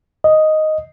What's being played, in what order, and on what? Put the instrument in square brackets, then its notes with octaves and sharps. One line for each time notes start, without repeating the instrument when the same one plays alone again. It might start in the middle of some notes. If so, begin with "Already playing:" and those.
[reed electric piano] D#5